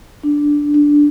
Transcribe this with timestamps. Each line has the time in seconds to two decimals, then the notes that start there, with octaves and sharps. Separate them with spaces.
0.23 D4
0.74 D4